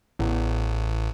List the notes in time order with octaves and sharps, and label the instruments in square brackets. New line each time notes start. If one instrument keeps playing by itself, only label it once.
[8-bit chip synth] A1 [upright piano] E2